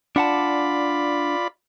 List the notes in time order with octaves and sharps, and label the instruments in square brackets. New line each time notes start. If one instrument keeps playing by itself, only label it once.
[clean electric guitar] D4 F#5 A5 [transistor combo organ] F4 D5 B5